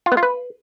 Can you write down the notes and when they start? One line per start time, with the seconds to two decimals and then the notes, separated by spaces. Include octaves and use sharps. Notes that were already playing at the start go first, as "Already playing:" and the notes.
0.06 F4
0.12 B3
0.17 F4
0.23 B4